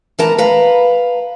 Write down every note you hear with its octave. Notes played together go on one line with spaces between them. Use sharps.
E3 B3 A#4 A5 A#5
B4 F5 A#5